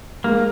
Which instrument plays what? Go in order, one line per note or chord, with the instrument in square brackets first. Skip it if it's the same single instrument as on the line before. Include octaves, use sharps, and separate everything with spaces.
[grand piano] G#3 [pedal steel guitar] A#3